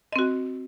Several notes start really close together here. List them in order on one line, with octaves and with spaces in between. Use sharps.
D#5 C4 F#4